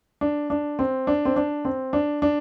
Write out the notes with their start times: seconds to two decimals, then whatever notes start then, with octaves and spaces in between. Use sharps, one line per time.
0.21 D4
0.50 D4
0.79 C4
1.07 D4
1.25 C4
1.36 D4
1.65 C4
1.93 D4
2.22 D4